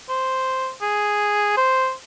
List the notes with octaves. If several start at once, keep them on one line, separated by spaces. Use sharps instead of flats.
C5
G#4
C5